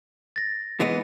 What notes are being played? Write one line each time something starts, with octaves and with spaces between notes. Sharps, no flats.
A6 A#6
E3 G#3 B3